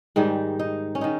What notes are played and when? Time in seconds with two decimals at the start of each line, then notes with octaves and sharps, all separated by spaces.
0.16 G#2 D#3 G3 D#4
0.59 D#4
0.95 C#4
1.01 D#3 D#4